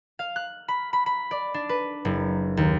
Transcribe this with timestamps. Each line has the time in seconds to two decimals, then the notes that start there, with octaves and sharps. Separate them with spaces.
0.19 F5
0.36 F#6
0.68 B5
0.93 B5
1.06 B5
1.31 D5
1.54 D4
1.69 B4
2.05 F#1
2.57 D#2